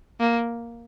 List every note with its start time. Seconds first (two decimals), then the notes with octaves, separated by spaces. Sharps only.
0.20 A#3